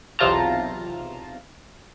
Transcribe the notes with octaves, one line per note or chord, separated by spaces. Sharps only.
B1 E2 C3 F4 A5 A#5